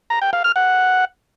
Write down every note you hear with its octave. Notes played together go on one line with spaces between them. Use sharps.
A#5
G5
F5
F6
F#5